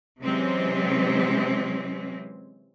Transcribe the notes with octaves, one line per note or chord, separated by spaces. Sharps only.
C3 E3 F#3 G#3 C4 C#4